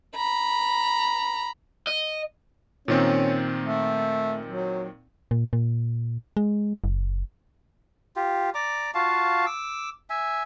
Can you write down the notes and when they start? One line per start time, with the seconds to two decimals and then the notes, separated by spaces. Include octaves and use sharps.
0.15 A#5 B5
1.87 D#5
2.88 A#2 D#3 C4 C#4
3.63 A3
4.47 F#3
5.31 A#2
5.53 A#2
6.37 G#3
6.84 F#1
8.16 F4 G4
8.54 D5 A#5 D6
8.95 F4 F#4 F5 A5
9.46 D6 E6
10.10 E5 G#5